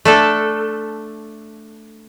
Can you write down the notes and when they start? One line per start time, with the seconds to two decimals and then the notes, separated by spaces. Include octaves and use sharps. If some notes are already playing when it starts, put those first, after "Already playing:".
0.05 A3 D4 A4